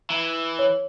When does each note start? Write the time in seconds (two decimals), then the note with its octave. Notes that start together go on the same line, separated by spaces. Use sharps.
0.10 E3
0.59 C#5